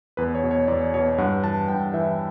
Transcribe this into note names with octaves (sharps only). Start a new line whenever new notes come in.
E2 B4
C#5
B2
C#5
E2 D5
B2 C#5
G2 F#5
E3 A5
G2 G5
E3 E5